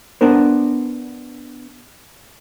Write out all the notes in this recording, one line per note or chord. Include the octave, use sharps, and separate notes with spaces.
B3 D4 A#4 C5